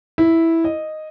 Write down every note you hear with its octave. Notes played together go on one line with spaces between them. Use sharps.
E4
D#5